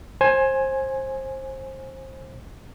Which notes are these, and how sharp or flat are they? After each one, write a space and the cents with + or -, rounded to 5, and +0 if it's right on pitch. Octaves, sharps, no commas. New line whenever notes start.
C5 +25 G#5 +0